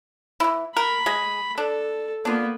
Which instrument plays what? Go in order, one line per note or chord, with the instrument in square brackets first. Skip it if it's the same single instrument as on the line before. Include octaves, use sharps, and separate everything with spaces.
[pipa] E3 E4
[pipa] A#4 [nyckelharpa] B5
[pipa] G#3 G#4
[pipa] D4 [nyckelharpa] A4
[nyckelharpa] A#3 B3 [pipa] D4 F4